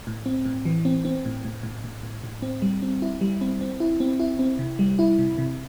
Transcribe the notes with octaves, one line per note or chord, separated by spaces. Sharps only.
A2
C4
A2
E3
C4
C4
A2
A2
A2
A2
A2
A2
C4
G3
C4
E4
G3
C4
C4
E4
C4
E4
C4
C3
G3
E4
C3
C3